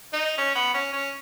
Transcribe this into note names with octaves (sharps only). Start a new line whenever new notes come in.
D#4
C#4
B3
C#4
C#4